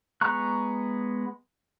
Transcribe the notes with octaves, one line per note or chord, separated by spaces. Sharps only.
G#3 B3 A#5 C#6 F#6